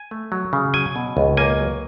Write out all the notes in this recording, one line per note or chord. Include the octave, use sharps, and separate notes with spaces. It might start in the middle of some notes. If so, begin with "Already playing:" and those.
Already playing: G#5
A3
F#3
C#3
F#3 G#5
B2
C#2
A#3 G#5
F#3